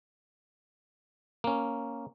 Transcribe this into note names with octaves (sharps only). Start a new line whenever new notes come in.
A#3 C#4